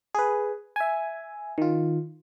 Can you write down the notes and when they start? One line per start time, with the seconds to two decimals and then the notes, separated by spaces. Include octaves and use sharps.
0.15 G#4 B4
0.76 E5 G#5
1.58 D#3 F4